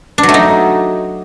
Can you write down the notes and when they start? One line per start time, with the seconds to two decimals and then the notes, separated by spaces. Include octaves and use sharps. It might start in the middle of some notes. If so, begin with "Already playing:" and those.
0.18 D4
0.23 F#3
0.29 A3
0.34 D#4